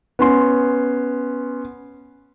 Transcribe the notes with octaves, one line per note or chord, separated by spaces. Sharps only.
B3 C#4 C6